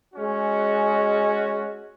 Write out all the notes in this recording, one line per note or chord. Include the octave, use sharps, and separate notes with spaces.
G#3 C#4 F#4